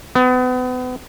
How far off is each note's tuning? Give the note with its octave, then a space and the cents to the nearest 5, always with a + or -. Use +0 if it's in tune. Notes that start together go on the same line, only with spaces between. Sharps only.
B3 +35